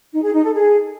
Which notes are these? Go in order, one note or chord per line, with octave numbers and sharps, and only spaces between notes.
D#4
G#4
D#4
A4
G#4